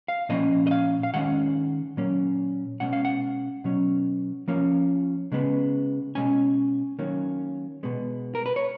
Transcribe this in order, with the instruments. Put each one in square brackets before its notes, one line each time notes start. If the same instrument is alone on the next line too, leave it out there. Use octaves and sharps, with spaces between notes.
[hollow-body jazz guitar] F5
A#2 F3 A#3 C#4 D#5
D#5
F5
F5
D#3 G#3 C#4 F#5
A#2 F#3 A#3 C#4
B2 G#3 C#4 F#5
F5
F#5
B2 F#3 C#4
F3 A#3 C#4
C#3 G#3 B3
B2 G#3 C#4 G#5
D#3 F#3 A#3 C#4
B2 G#3 B3
A#4
B4
C#5